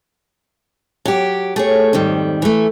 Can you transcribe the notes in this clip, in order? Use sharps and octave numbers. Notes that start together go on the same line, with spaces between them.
F#3 G4
A3 G#4 C#5
F2 G#2 D#3 G3
E3 A3